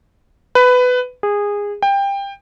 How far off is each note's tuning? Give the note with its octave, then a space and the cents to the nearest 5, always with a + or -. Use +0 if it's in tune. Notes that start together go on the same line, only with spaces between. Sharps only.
B4 +15
G#4 -20
G5 +20